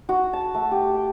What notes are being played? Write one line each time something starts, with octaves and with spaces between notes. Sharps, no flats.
F#4
A5
A3
G4
G5